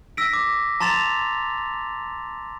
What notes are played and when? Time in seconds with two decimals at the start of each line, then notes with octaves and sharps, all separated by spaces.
0.17 E6 A#6 B6 D7
0.33 D6
0.80 A5 A#5 C6 A6 E7 F7